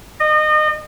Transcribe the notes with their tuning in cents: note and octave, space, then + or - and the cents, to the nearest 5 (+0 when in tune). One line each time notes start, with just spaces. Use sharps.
D#5 -30